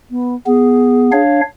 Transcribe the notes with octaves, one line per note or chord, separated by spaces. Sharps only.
B3
B3 G#4
D4 C#5 F5